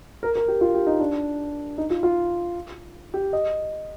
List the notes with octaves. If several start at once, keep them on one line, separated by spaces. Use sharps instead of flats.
A#4
A#4
G4
F4
G4
D#4
D4
D#4
F4
F4
G4
D#5